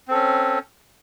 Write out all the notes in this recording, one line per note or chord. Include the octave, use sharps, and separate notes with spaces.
C4 C#4 A4